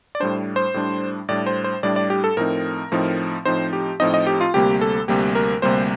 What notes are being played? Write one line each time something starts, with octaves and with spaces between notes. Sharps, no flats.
D5
A2 G3 D4 C5
C5
A2 G3 D4
A2 G3 D4 D5
C5
C5
A2 G3 D4 D5
D5
G4
A4
A2 F3 C4 D#4 A#4
A2 F3 C4 D#4
A2 F3 C4 D#4 C5
G4
A2 F3 C4 D#4 D#5
D#5
G4
F4
D2 C3 G3 A#3 G4
A4
D2 C3 G3 A#3 G4
A#4
D2 C3 G3 A#3 C5